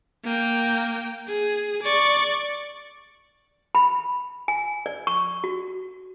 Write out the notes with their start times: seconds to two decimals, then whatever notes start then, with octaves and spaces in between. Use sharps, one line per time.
0.24 A#3 G5
1.28 G#4
1.83 D5 C#6
3.75 B5
4.48 G#5
4.86 D5
5.07 C#6
5.44 F#4